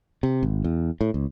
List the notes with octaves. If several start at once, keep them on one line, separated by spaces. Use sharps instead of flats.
C3
G#1
E2
A2
C#2